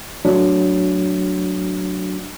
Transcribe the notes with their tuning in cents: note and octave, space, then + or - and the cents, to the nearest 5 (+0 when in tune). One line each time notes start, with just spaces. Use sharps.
F#3 +0 A3 +0 D4 +0